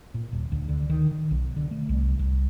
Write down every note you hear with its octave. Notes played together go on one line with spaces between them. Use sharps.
A#2
D#1
D2
D3
D#3
D#3
B1
D3
A3
C2
C2